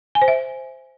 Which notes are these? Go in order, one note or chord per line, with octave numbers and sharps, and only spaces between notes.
G#5
C5
E5